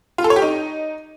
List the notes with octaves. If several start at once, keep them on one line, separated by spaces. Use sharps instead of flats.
F4
A4
C#5
G4
D#4